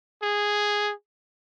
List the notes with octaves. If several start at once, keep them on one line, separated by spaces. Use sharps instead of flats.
G#4